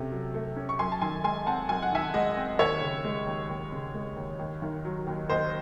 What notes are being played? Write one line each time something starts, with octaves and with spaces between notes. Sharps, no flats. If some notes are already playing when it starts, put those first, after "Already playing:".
Already playing: C3 A3 C#4
F#3
A3
C#4
C#6
F#2 G#5 C6
A5
D#3 G#5 C6
G#3 G#5 C6
C4 F#5 A5
F#2 G#5
F#5
D#3 E5 G#5
G#3 D#5 F#5
C4
D#2 C#5 E5
C#3
G#3
D#2
D#2
C#3
G#3
D#2
D#2
D#3
F#3
D#2
D#2 C5 D#5